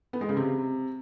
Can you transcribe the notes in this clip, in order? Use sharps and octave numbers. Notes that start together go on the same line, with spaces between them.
B3
G#3
C#3
C3